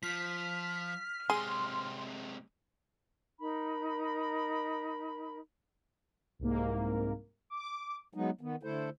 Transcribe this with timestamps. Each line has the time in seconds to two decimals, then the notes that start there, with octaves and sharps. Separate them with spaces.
0.03 F3 F6 B6
1.30 C3 G#3 G#4 C6
3.40 D#4 A#4 B5
6.39 C2 G#2 A#3
7.50 D6
8.14 F#3 G#3 B3 D#4
8.41 D#3 B3
8.63 D3 A3 E4 A4 C5